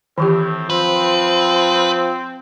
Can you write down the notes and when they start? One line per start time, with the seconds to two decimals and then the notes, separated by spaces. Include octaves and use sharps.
0.18 A2 D#3 E3 C4 G4
0.70 F3 C4 B4